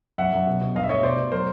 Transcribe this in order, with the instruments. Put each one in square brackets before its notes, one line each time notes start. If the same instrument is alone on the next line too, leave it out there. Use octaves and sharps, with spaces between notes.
[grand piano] F#2 E5 F#5
F#2
B2
B2
G2 D#5 F5
E5
A3 C#5 D#5
B2 C5 D5
B2
F#3 A#4 C5